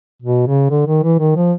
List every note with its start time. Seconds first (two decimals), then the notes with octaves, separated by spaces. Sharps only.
0.23 B2
0.47 C#3
0.71 D3
0.87 D#3
1.03 E3
1.19 D#3
1.36 F3